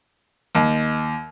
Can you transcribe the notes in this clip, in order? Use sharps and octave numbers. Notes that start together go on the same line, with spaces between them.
D#2